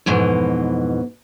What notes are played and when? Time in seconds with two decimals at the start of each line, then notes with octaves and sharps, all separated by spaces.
0.06 F2 G#2 B2 E3